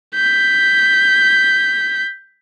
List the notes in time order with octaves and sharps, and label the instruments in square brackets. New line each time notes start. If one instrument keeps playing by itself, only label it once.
[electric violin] G6 B6